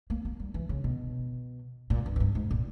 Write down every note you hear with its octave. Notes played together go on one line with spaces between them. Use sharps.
A#3
A#3
G3
E3
C#3
B2
A#2
G2
E2
G2
G#2
A#2